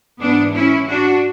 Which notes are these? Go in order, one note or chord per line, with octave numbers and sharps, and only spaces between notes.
G#2 E3 B3 D4
C#4 E4
D4 F#4